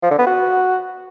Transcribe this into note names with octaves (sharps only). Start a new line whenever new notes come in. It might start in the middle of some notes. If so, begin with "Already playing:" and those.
F3
D3
B3
F#4